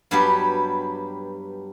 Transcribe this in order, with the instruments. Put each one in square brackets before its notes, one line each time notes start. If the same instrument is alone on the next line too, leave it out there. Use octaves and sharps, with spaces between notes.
[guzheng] G2 F#3 G3 B3 F#4 G4